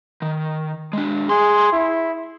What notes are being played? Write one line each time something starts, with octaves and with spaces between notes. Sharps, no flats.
D#3
G#3 D4
G#4 C6
E4